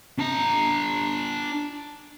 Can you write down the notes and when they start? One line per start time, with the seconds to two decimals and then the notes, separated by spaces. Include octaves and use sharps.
0.19 D4 A#5